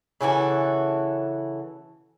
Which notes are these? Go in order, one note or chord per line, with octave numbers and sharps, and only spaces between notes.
C#3 E3 F#4 A4